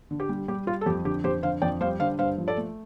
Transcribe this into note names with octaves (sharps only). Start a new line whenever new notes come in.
D3
G4
G3
G3 G4
G3 F4
A4
F2 G4
D3 G4
F2 G4 C5
D3 C5 F5
F2 D5 G5
G3 C5 F5
D3 C5 F5
G2 C5 F5
F3
A4 D5
A3